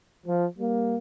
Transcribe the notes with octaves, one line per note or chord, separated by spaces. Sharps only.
F3
G3 A#3